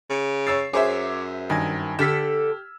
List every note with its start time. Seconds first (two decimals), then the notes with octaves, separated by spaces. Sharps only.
0.10 C#3
0.47 C#5 E6 A6 C7
0.73 F#2 G#4 C5 C#5 E5 D6
1.50 G2 D#3 G#5 G#6
1.99 D3 G4 A4 E6 F6 B6 E7